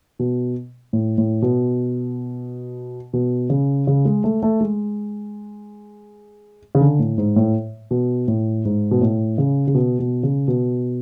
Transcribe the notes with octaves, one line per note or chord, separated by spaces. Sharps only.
B2
A2
A2
B2
B2
C#3
C#3
G#3
A3
A3
G#3
C#3
D3
A2
G#2
A2
B2
A2
G#2
B2
A2
C#3
C#3
B2
B2
C#3
B2